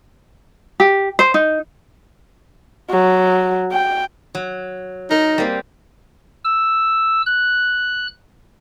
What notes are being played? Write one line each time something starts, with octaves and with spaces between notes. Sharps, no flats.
G4
C5
D#4
F#3
G5
F#3
D#4 A#4
G3 A#3 C4
E6
F#6